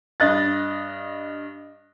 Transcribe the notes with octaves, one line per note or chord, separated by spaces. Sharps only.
G2 D#5 F#6 A6